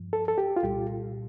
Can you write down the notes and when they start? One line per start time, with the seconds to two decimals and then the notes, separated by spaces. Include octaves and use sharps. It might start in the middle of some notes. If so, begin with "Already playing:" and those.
Already playing: G2 F3
0.13 A4
0.28 A4
0.38 G4
0.56 F4
0.63 C2 A#2 G3 G4